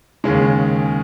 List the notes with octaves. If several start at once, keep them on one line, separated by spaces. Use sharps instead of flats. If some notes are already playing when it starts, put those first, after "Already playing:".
D#2 C#3 G#3